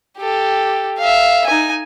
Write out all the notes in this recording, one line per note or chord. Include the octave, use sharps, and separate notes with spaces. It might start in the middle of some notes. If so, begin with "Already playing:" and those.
G4 A4
E5 F5
D#4 G#5